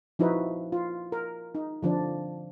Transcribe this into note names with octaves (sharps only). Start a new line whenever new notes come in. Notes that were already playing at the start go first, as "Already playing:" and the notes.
F3 D#4 E4 F#4 B4
F4
A#4
D#4
D3 F3 D4